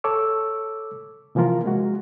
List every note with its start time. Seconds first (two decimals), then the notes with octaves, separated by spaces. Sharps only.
0.04 A4 C#5 D6 E6
1.35 C3 E3 F3 A#3 F4 A#4
1.66 G#3 F#4